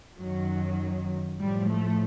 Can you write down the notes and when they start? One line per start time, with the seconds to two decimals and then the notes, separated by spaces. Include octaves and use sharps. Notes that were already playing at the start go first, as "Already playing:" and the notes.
0.18 F#2 D#3 F#3
1.40 A2 F3 G3
1.70 A3